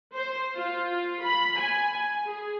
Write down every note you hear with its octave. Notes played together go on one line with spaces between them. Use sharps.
C5
F4
B5
G#5
G#4